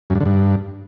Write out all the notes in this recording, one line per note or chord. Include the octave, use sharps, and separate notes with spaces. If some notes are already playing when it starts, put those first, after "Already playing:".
F#2
G2
D3
G2